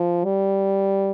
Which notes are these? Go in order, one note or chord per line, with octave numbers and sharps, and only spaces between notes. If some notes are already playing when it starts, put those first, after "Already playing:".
Already playing: F3
G3